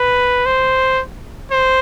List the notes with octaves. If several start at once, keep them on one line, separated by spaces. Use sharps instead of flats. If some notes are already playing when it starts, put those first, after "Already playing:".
Already playing: B4
C5
C5